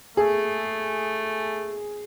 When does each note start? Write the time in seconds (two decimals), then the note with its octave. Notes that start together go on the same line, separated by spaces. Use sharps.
0.17 A3 G#4